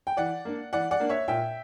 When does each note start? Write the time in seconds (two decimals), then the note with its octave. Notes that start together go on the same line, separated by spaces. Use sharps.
0.07 G5
0.17 E3 D5 F#5
0.45 A#3 D4
0.73 E3 D5 F#5
0.91 D5 F#5
1.00 A#3 D4
1.10 C#5 E5
1.28 A#2 E5 G5